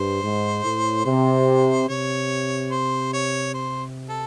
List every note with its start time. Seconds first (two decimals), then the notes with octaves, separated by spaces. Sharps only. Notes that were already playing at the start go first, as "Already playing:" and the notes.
Already playing: G2 C5
0.23 G#2
0.64 A2
1.05 C3 C5
1.88 C3 C#5
2.71 C5
3.13 C#5
3.54 C5
4.09 A4